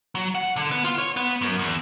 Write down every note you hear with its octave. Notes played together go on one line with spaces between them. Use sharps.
F#3
F#5
D3
B3
F4
C#5
B3
F#2
E2